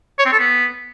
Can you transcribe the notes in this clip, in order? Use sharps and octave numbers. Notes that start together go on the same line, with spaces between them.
C#5
C4
A4
B3